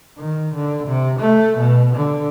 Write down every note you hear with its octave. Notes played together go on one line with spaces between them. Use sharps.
D#3
D3
C3
A3
B2
D3